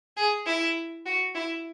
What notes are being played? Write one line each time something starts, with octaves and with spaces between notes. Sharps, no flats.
G#4
E4
F#4
E4